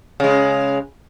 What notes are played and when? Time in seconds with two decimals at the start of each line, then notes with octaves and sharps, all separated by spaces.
0.20 C#3 G#3